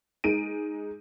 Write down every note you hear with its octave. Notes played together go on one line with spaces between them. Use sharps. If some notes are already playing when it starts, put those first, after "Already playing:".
G#3 D#4 D7 D#7